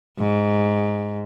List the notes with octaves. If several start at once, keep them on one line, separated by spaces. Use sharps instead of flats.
G#2